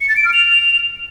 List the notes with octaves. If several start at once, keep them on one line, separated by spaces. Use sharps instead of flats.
C#7
A6
D7
F6
F7